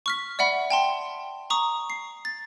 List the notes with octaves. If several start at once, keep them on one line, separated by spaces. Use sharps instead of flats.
C#6 F6 B6
D5 E5 F#5 B5
G5 A5 C6
A#5 C#6 D#6
C7
A6